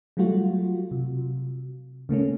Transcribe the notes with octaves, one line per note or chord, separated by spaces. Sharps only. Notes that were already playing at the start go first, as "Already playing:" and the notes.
F#3 G3 A3 F4 F#4
C3
C#3 A3 A#3 C#4